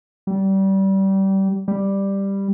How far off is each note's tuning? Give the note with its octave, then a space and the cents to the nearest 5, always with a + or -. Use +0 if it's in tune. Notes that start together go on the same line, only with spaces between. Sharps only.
G3 -25
G3 +5